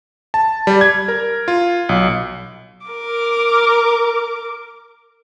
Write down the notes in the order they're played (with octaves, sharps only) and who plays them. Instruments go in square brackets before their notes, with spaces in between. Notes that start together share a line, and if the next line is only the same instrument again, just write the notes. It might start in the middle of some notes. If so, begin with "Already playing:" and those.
[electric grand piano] A5
G3
G#6
A#4
F4
B1
[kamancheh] A#4 D6